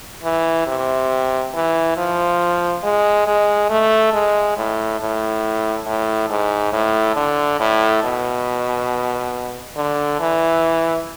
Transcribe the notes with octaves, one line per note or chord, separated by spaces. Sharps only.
E3
C3
E3
F3
G#3
G#3
A3
G#3
A2
A2
A2
G#2
A2
D3
A2
B2
D3
E3